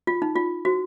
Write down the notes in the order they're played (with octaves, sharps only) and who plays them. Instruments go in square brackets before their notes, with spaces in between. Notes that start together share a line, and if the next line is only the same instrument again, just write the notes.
[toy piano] F4
D#4
F4
F#4